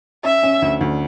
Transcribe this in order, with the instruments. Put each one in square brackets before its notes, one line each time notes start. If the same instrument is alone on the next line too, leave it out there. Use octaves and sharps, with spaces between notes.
[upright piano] C#4 [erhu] E5
[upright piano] C#4
D2
D2